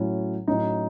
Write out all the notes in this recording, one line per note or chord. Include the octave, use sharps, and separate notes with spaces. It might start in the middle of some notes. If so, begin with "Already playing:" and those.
Already playing: A2 F#3 C#4 E4
A2 F#3 C#4 D#4 E4